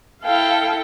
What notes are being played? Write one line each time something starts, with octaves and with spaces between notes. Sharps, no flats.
E4 A4 F5 G5